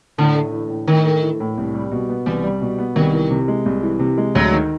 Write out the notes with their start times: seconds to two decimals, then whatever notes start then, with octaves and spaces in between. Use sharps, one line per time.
0.18 A2 D3
0.35 A3
0.53 E3
0.70 A2
0.88 A2 D#3
1.05 A3
1.23 E3
1.40 A2
1.58 C2
1.75 G3
1.91 B2
2.09 B3
2.26 C2 E3
2.44 G3
2.61 B2
2.78 B3
2.96 C2 D#3
3.13 E3
3.30 C3
3.48 G#3
3.66 C2
3.83 E3
4.00 C3
4.18 G#3
4.35 D2 F#3
4.52 D#3